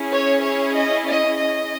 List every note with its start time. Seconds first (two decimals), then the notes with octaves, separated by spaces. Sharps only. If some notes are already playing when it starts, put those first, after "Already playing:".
Already playing: C#4 E4 G#4
0.12 C#5
0.44 C#5
0.75 D#5
1.07 D#5
1.38 D#5